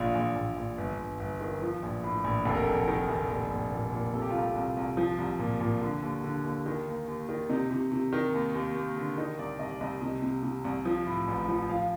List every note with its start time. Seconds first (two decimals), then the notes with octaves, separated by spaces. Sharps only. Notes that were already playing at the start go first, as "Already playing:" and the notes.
Already playing: A#1 F4
0.15 A#1
0.36 A#1
0.57 A#1
0.78 G1
0.98 G1
1.20 G1
1.40 D#3
1.62 F3
1.83 A#1
2.04 A2
2.24 A#1
2.45 F1 A4
2.54 A#4
2.63 F1 A4
2.88 D#3
3.09 F1
3.29 A#1
3.50 A#1
3.72 A#2
3.92 A#2
4.14 C3 A4
4.22 G4
4.30 F4
4.35 C2 G4
4.55 C2
4.77 C2
4.97 F3
5.18 C2
5.39 A#2
5.60 A#2
5.81 D3
6.02 D#2
6.24 D3
6.44 D#2
6.66 D#3
6.87 D#2
7.08 D#2
7.29 D#3
7.49 C3 D#4
7.71 C3
7.92 C3
8.12 D#3
8.33 D#2
8.55 D#2
8.75 D#2
8.97 D3
9.18 D#3 D#4
9.39 C2 D5
9.59 C2 D#5
9.70 D5
9.81 C2 D#5
10.02 C3
10.22 C3
10.43 C3
10.65 C2
10.85 F3
11.07 A2
11.28 A1
11.48 F3
11.70 F3 F5